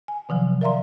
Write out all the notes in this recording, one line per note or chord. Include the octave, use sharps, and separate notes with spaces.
G#5
C3 D#3 F3 F#3
A#4 D5 E5 F5 A#5 C6